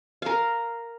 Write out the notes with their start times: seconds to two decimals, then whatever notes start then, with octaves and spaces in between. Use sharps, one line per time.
0.22 A#4 F5